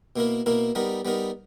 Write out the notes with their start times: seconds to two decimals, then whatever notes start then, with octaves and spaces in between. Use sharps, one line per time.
0.16 B2 A#3 E4 A#4
0.46 B2 A#3 E4 A#4
0.75 G3 B3 D#4 A#4
1.05 G3 B3 D#4 A#4